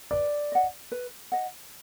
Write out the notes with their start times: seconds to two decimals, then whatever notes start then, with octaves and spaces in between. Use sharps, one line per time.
0.11 B4 D5
0.52 D#5 F#5
0.92 B4
1.32 D#5 F#5